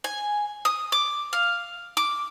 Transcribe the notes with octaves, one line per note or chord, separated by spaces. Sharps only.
G#5
D#6
D6
F5
D6